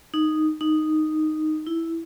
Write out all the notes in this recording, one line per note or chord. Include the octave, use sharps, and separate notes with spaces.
D#4
D#4
E4